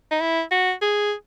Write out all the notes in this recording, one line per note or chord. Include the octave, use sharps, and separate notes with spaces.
D#4
E4
F#4
G#4